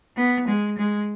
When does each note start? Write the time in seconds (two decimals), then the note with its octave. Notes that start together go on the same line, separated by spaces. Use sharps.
0.17 B3
0.47 G#3
0.78 G#3